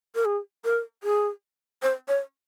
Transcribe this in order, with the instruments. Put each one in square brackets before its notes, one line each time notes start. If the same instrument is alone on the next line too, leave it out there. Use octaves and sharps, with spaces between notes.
[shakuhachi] A#4
G#4
A#4
G#4
C5
C#5